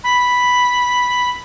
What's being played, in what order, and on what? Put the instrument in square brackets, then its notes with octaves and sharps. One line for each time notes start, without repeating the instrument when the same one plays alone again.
[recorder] B5